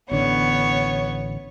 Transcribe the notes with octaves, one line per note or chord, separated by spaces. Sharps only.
A1 D3 B3 C#5